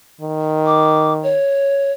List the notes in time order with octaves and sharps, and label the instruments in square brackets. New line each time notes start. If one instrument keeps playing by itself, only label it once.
[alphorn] D#3
[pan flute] D6
C#5